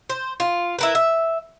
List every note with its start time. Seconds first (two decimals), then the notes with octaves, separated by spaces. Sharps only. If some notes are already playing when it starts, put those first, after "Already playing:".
0.10 C5
0.40 F4
0.79 E4 A#4 B4
0.95 E5